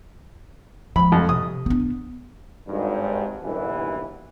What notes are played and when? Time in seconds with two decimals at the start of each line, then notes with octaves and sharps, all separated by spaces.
0.96 F3 G#3 B5
1.12 F2
1.29 C3 D#6
1.66 B3 D4
2.68 G#1 G2
3.42 F#1 B1 G2 E3